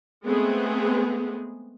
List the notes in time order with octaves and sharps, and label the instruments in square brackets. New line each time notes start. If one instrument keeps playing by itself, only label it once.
[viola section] G#3 A3 B3 C4 G#4